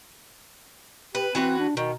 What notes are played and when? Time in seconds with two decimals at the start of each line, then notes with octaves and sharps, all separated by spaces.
1.15 G4 B4
1.35 E3 C4 F#4 B4
1.59 D4
1.77 B2 D#3